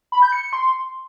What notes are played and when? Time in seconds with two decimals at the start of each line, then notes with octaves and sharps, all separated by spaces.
0.12 B5
0.22 G6
0.32 C#7
0.43 C#7
0.53 C6